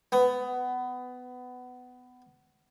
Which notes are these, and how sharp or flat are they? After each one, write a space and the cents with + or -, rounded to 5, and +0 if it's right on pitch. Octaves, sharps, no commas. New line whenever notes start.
B3 +20